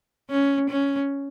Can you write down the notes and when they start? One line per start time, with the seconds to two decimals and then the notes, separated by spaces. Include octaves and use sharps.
0.30 C#4
0.70 C#4